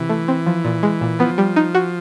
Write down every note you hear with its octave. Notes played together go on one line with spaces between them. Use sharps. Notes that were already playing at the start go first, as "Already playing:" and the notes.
Already playing: C3 E3
A3
C4
F3
A#2
G#3
A#2
F3 B3
G3
D#4
F#4